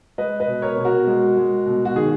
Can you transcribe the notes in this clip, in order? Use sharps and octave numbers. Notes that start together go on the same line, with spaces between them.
G#3 B4 D#5
B4 D#5
B2
A#4 C#5
B2
F#4 A#4
G#3
G#3
B2
F#4
D#3 G#4